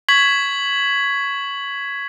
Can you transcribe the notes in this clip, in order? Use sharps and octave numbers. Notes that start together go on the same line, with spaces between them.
C#6 G#6 B6 F#7